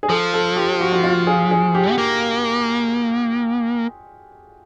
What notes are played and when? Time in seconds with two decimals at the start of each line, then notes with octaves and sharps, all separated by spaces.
0.03 G#4
0.09 F3 A4
0.33 A4
0.56 G4
0.81 F#4
0.93 F#4
1.04 F4
1.27 G#4
1.51 G#4
1.75 G4
1.91 B3
1.98 A#3